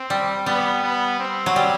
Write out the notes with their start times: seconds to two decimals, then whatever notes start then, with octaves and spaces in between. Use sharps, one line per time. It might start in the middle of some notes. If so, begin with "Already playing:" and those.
Already playing: C4
0.10 G3
0.46 G3 B3
0.84 B3
1.20 C4
1.46 F#3
1.56 G3